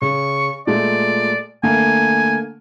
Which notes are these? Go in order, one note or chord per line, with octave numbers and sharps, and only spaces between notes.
C#3 C#6
A#2 G#3 A3 D5
D3 A3 A#3 G#5